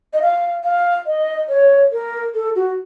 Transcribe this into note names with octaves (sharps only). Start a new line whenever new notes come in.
D#5
F5
F5
D#5
C#5
A#4
A4
F#4